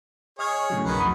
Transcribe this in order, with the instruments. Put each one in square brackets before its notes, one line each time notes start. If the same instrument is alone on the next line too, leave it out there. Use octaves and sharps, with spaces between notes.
[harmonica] G#4 C#5 [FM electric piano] D#5 F6 G#6
[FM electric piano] A2 C#3 F#3
[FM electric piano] B1 F#2 [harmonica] D#3 B4 F#5
[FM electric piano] F2 B5 D#6